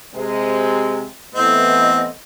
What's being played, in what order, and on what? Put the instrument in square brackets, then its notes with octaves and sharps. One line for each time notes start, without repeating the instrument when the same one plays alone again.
[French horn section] C3 G#3 C4
[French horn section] E3 A3 B3 [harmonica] C4 [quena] D#5